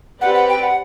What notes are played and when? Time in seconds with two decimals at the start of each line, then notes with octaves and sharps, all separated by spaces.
0.20 C4 G4 B4 D5 F#5
0.34 F#5
0.48 G5
0.62 F#5